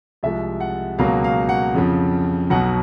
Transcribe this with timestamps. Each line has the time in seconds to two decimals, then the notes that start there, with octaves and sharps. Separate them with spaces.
0.23 C2 C3 F3 G#3 E5
0.60 F#5
0.98 C#2 B2 F#3 A#3 F5
1.24 F5
1.49 F#5
1.74 F2 C#3 F3
2.50 B1 B2 F#3 F#5